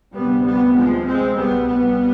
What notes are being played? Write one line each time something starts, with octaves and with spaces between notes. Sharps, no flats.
D2 C3 G3 B3
G3 B3
F3 G#3
G#3 C4
C2 B2 G3 B3
G3 B3